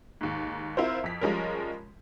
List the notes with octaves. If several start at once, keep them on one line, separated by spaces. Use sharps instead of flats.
D#2 G#2
C4 E4 F4 A#4 C5
F2 B6
F3 G3 G#3 C#4 A#4